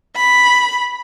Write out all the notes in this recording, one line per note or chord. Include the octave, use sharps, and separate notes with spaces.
B5